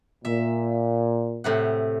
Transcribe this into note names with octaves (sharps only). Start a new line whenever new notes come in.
A#2 E5
A2 C3 F#5